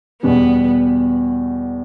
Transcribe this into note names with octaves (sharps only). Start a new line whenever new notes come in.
E2 B2 G3 B3